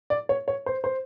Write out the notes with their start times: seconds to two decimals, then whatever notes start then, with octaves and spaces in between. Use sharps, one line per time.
0.10 D5
0.29 C#5
0.48 C#5
0.66 C5
0.84 C5